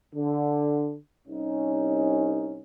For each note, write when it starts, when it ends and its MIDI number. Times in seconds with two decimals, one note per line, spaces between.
0.13 0.94 50
1.26 2.63 36
1.26 2.63 61
1.26 2.63 63